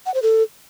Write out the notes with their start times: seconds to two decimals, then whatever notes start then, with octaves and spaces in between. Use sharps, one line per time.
0.06 F#5
0.14 C5
0.22 A4